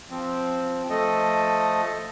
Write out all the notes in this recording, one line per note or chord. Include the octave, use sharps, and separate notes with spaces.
F3 C4
F3 A3 A4 D#5